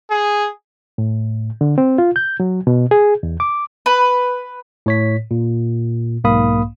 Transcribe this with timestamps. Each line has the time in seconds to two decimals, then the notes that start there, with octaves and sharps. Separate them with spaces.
0.11 G#4
0.98 A2
1.61 D3
1.78 C4
1.98 F4
2.16 G6
2.40 F#3
2.67 B2
2.91 G#4
3.23 E2
3.40 D6
3.86 B4
4.86 A2 C#5 B6
5.31 A#2
6.24 B1 G#2 A#3 F5 B5 D#6